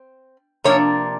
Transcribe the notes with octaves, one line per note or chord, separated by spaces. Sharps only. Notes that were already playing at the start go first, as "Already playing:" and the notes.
Already playing: C4
C3 F3 A#3 D4 C#5